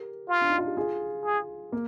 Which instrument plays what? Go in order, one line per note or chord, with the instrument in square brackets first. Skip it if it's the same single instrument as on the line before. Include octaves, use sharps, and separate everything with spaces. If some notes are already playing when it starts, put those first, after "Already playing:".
Already playing: [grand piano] G4 A#4
[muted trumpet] F4
[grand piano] D4
D#4
F4
G4
F4 G#4
[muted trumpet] G#4
[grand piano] A#3